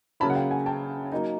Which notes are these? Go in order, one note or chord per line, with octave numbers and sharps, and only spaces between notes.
C#3 F#3 A#3 C#4 E4 A5 B5
F#5
F5 G5
F#5 G#5
G5 A5
F#3 A#3 D#4